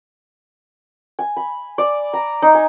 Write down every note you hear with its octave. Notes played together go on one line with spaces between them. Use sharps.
G#5
B5
D5
A#5
D#4
G#5